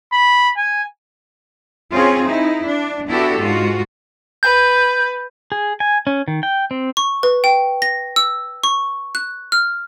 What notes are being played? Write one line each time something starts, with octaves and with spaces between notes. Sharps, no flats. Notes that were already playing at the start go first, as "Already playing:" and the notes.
B5
G#5
C4 C#4 F4 G#4
D#4 E4
D4
B3 D4 E4 F#4 G4 A4
G#2 F4 F#4
B4 G6
G#4
G#5
C#4
D#3
G5
C4
C#6
B4
G5
A#6
E6
C#6
F#6
F6